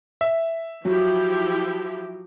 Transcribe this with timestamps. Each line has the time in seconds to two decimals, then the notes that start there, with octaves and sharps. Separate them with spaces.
0.21 E5
0.85 F3 F#3 E4 G4